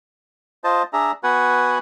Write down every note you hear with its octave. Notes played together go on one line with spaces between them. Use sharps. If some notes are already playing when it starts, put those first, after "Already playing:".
F4 C5 D#5 A5
D4 G#4 E5 A#5
B3 F#4 B4 F#5 G#5